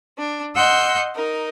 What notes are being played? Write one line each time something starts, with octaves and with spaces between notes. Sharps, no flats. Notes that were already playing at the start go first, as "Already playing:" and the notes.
D4
D#5 F#5 C6 E6 G6
D#4 A#4